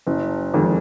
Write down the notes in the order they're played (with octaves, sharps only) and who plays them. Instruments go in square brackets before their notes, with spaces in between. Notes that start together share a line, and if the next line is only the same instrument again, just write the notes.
[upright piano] F#1
F2 D#3 G#3